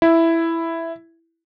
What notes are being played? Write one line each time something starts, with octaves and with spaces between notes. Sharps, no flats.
E4